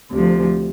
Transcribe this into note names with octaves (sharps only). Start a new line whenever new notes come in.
D2 C3 F3